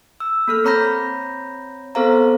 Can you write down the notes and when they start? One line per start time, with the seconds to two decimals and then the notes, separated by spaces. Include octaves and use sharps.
0.20 E6
0.48 A#3 A4 F6
0.64 C4 C#5 A#5 B5 G6 A#6
1.95 B3 C4 A4 C5 F5 A#5